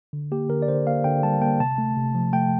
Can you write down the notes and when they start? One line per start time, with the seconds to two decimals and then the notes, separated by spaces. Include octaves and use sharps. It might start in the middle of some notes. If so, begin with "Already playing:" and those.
0.13 D3
0.32 A#3 G4
0.49 D3 A#4
0.62 D5
0.68 D3 C5
0.86 A#3 F5
1.04 D3 G5
1.23 G3 A5
1.41 A#3 G5
1.60 C3 A5
1.78 A3
1.97 C3
2.15 F3
2.33 A3 G5